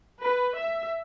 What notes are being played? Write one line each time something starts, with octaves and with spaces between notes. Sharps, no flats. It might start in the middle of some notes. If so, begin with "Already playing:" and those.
B4
E5